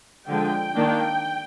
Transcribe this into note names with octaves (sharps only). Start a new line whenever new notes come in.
D3 F3 G#3 G5
D#3 A#3 D4